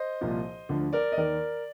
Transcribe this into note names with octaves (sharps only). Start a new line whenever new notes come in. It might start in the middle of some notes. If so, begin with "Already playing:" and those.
Already playing: C5 D#5
C2 A#2 F3
D2 D3 F3
A#4 D5
D#5
D#2 D#3 A#4 D5